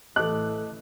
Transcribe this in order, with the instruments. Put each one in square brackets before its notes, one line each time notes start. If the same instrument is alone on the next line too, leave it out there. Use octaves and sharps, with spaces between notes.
[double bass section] A1 E3 A3 [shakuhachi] A4 [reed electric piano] D#5 A5 D6 [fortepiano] F#6